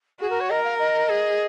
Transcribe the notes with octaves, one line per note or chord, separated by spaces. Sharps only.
F#4 G#4
A#4
C#5
A#4 D#5
F5
D#5
G#4